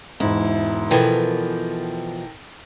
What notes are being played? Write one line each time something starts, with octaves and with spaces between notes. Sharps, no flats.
E1 G#2 E4
B2 E3 F3 A4 A#4 G5